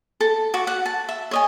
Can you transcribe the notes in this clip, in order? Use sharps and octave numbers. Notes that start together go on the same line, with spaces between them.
A4
F#4 D6
F#5
A5
E5
C#5 D#5 G#5